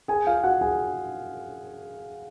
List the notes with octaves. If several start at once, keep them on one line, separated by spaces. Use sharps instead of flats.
G#4 G#5
F4 F5
F#4 F#5
G#4 G#5